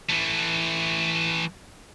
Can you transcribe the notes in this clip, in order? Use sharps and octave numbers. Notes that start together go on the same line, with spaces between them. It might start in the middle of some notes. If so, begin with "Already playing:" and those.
E3 A3